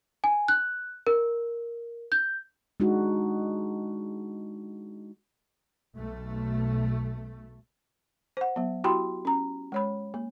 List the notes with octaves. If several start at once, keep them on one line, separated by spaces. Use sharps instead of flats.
G#5
F#6
A#4
G6
G#3 D4 D#4 F#4
B1 A3
C5 F#5
F#3 B3
E4 F#4 G4 G5 B5 C6
C#4 A#5
G#3 C#5 B5
A#3